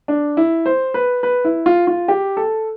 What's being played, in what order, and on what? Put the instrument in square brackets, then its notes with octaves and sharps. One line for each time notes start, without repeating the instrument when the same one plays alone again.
[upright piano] D4
E4
C5
B4
B4
E4
F4
F4
G4
A4